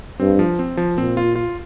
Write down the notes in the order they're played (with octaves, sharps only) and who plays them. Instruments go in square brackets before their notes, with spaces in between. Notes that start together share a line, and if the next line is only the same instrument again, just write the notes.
[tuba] G2 [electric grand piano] C4
[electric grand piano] F3
C4
F3
[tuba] A#2 [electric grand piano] C4
[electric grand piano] F4
F4